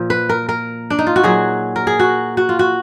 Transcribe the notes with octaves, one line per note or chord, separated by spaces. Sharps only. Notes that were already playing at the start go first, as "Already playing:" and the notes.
Already playing: A#2 F3
B4
A#4
A#4
D4
D#4
F4
F#4
A#2 F#3 G#4
A#4
G#4
F#4
F#4
F4
F#4